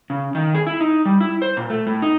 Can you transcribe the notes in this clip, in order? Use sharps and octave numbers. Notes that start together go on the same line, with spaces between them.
C#3
D#3
G#4
E4
D#4
G3
E4
C5
A#2
A3
A2
D#4